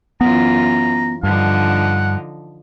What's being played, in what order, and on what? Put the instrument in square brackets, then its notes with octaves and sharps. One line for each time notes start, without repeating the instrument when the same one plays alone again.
[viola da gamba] F#2 E3 F4 [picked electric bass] B3 [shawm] A#5
[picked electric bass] G2 [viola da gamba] D3 F3 D#4 [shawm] F#5